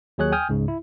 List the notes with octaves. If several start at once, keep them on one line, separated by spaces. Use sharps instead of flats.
D#2 F#3 G#4 C#5 F#6
G5 G#5 D#6 F6 G6
C#2 G#2 C#3
E4